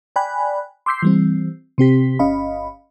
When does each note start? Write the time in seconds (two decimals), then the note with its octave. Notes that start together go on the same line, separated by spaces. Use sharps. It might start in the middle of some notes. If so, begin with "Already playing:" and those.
0.16 D5 G5 G#5 B5 F#6
0.86 C6 D6 E6 G6 B6 C7
1.02 E3 G3 C4
1.78 C3 C4 G4 B6
2.19 G1 C#4 D#5 F5 B5